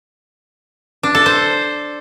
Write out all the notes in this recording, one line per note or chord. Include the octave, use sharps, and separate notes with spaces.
D4
A4
C5